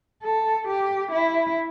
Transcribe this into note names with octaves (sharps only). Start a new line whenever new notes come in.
A4
G4
E4